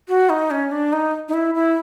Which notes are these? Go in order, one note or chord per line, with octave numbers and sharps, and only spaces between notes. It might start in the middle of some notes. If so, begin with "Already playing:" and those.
F#4
D#4
C#4
D4
D#4
D#4
E4
E4